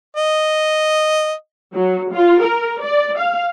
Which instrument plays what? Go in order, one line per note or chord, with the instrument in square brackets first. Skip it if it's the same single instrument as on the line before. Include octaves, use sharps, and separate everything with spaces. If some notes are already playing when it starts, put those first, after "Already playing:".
[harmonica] D#5
[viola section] F#3
F4
A#4
D5
F5